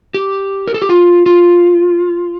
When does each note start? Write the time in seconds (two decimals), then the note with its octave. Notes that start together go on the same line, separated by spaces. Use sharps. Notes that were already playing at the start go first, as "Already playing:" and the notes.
0.14 G4
0.68 A#4
0.74 A4
0.82 G4
0.89 F4
1.26 F4